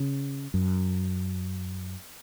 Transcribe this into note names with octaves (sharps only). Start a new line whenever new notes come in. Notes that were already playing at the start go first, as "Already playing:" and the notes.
Already playing: C#3
F#2